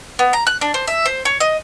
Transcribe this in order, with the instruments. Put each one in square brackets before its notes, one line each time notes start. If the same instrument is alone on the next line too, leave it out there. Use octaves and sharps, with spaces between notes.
[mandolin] B3
A#5
F#6
D4
C5
E5
C5
C#5
D#5